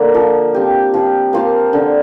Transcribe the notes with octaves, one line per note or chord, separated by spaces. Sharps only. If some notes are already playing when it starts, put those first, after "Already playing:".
Already playing: D3 A#3
F3
C4 G4
F3
A#3 F4 C5
D3